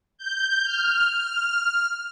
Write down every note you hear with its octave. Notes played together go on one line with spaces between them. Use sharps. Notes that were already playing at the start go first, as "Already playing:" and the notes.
G6
F6